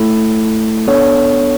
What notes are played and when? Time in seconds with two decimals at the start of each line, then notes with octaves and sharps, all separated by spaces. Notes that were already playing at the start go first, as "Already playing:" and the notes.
Already playing: A3 E4 A4
0.87 B3 D4 A4 C#5